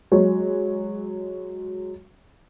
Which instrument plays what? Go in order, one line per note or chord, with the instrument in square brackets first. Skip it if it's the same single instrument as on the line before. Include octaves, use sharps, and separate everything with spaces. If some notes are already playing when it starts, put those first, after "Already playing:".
[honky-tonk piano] F#3 G#3 C#5